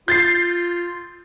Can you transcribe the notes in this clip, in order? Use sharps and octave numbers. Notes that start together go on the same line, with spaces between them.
F4 G6 A6 C7